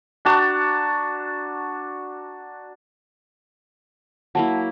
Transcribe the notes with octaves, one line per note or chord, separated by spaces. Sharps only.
D4 F#4 A5 A#5
F#3 A#3 E4 F#5 A5